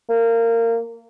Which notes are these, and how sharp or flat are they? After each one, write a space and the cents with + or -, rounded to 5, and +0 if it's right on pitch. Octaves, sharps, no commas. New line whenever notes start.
A#3 -20